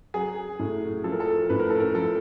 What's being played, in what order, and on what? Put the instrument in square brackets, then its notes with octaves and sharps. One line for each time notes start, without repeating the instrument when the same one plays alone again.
[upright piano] F#3 G#4
A2
F3 A4
A#4
A4
A2 B4
A#4
A4
A#4
F3 A4